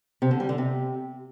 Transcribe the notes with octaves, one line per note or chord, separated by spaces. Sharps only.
C3
D3
G3
D3
C3